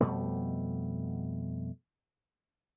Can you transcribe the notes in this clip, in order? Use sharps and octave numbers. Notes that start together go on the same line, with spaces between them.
F2 B2 G3 A3